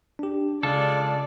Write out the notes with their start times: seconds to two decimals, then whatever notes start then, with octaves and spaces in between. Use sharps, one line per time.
0.19 D4 G4
0.63 C#3 G#3 F4 G#4 A4 D5